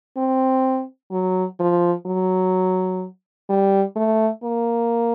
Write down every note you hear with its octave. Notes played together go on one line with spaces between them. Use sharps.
C4
F#3
F3
F#3
G3
A3
A#3